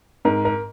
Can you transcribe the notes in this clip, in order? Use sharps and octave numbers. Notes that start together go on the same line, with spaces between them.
G#2 A#4
A#4